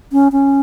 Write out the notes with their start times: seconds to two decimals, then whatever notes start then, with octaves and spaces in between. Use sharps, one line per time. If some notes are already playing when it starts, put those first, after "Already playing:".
0.12 C#4
0.32 C#4